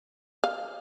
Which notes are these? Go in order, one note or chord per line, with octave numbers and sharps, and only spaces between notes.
F5